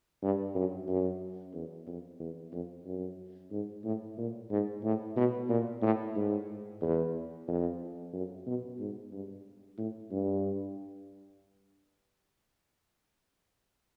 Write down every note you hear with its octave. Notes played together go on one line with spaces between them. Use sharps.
G2
F#2
F#2
E2
F2
E2
F2
F#2
G#2
A2
A#2
G#2
A2
B2
A#2
A2
G#2
E2
F2
F#2
B2
G#2
G2
A2
G2